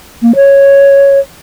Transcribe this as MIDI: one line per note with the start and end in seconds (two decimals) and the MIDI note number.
0.22 0.32 58
0.36 1.19 73